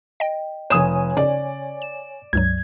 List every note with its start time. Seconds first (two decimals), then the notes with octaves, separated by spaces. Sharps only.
0.20 D#5 G5
0.70 F1 C#5 G#5 D#6 E7
1.17 C#3 C#4 D5
1.82 E7
2.33 C#2 G2 F#3 G#6